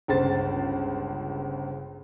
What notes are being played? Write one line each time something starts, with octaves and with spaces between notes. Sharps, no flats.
G1 C#2 C5 A6